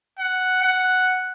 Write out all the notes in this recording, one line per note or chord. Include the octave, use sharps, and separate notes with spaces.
F#5
F#5